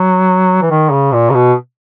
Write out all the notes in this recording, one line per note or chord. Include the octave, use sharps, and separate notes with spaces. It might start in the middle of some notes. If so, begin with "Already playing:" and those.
Already playing: F#3
E3
D#3
C#3
A#2
C#3
B2